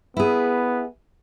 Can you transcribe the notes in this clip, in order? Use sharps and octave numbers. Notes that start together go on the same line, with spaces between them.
B3 E4 G#4